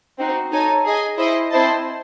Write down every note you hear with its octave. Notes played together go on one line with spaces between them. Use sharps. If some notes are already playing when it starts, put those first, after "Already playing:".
C4 D#4 F#4
D#4 A4 C#5 G#5
G#4 D#5 G#5
E4 C5 D#5
C4 E4 C5 D#5 A5